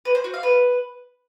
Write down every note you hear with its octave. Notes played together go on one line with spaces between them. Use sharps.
B4
C5
F#4
F5
B4